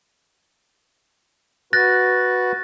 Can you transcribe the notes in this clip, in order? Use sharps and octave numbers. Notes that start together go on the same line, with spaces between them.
F#4 B4 F#6 A6 A#6